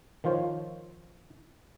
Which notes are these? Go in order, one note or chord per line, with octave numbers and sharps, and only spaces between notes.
D#3 F3 F4 C5 C#5